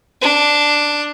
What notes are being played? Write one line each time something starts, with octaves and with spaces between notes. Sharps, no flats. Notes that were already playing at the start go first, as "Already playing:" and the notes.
D4